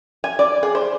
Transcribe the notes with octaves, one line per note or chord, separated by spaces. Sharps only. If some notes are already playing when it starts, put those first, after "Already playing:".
G#5
D5
G#4
C5